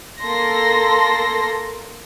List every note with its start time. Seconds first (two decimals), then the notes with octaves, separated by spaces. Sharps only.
0.21 A#3 A4 C6 A#6